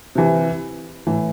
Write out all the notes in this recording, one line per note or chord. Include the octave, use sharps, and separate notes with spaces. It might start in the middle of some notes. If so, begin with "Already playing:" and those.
C3 E3
A2 E3